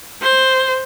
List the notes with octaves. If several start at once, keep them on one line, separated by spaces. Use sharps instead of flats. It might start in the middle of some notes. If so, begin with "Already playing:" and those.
C5